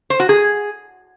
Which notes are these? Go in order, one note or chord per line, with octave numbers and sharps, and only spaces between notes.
C5
F#4
G#4